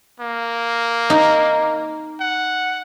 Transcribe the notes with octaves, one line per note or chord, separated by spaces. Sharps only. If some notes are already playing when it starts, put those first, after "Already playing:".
A#3
D#4
F#5